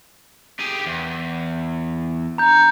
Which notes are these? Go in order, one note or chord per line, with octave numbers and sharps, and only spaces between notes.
G4 G#4
E2
A#5 G6